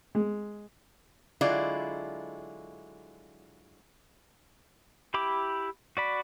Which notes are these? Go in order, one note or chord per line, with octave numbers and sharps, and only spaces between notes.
G#3
D3 F#3 G#3 E4 F4 D5
E4 G4 B5 D6
F#4 D5 B5